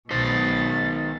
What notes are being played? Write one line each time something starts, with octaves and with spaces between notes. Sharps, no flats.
B1 B2 D#3 C5 A6